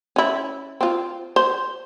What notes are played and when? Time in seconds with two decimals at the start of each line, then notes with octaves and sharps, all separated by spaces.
0.16 C#4 E4
0.81 C4 F4
1.36 C5